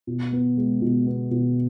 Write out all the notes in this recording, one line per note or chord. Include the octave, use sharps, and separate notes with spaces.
B2
B3
G#3
B2
B3
B2